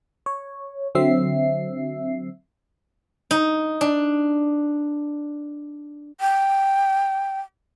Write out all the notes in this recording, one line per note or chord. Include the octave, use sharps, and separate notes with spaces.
C#5
D3 F#3 C4 E5 C7
D#4
D4
G5